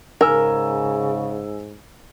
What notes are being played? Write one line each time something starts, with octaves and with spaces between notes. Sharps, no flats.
G#2 C#3 A#4 G#5 E6